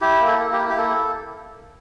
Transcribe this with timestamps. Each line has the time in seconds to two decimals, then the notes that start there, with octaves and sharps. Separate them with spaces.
0.01 E4 G4
0.21 A#3
0.27 A4
0.39 A#3
0.52 G4
0.58 E4
0.69 G4
0.77 A#3 A4